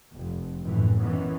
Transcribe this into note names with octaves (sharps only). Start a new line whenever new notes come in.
F1 F2
F1 A#1 F#2 A2 E3
A#1 B2 D#3 E3 B3 C#4